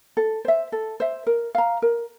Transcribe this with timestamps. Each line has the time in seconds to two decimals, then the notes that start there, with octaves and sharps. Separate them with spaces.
0.17 A4
0.45 C5 E5
0.72 A4
1.00 C5 E5
1.27 A#4
1.55 F5 A#5
1.82 A#4